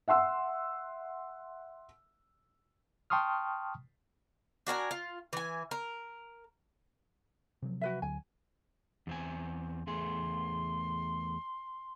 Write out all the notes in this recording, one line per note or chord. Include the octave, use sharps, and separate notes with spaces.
E5 F#5 C6 E6
G5 A5 C6 C#6 D#6 F6
D4 F#4 A#4 G#5
F4
E3 G#5
A#4
C3 F3 F#3
F#4 B4 E5
D2 D3 F#3 G#5
E2 C4 G#5
E2 A3 G#4 C6